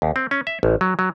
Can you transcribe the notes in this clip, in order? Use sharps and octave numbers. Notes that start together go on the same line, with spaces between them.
D#2
C4
C#4
E5
A1
F#3
F#3